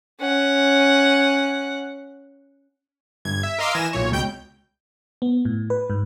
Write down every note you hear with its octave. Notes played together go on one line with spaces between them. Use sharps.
C#4 F#5
G1 G#6
E5
A#4 D#5 F5 C6 D6 E6
E3 G#5 A#6 E7
B1 A#2 C#5
C#2 B2 G5 G6 D7
B3
A2
B4
G#2